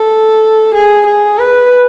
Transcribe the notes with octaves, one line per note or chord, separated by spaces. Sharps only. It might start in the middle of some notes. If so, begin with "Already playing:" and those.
Already playing: A4
G#4
G#4
B4